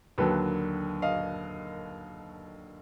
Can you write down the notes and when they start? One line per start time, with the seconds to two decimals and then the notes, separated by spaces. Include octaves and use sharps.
0.18 D#2 D3 F#3 A#3 A4 B4
1.02 D#5 F5